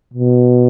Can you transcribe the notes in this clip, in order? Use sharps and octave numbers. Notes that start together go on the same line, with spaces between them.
B2